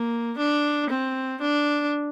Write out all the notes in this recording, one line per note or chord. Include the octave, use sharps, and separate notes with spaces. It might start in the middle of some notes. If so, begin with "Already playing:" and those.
Already playing: A#3
D4
C4
D4